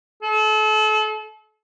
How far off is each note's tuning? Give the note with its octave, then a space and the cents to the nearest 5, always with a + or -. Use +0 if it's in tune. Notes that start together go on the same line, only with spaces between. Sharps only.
A4 -35